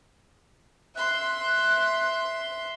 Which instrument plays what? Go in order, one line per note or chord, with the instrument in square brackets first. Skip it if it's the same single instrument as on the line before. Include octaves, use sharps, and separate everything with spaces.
[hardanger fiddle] E5 C6 [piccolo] F#6